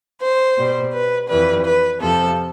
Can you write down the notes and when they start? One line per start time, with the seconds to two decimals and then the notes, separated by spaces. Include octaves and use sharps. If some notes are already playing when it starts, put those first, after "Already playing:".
0.22 C5
0.58 B2 G3
0.94 B4
1.29 F2 E3 G3 B4
1.66 B4
2.01 F2 C3 F3 A4